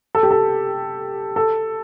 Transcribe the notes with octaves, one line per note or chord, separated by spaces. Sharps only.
A4
G4
A4
A4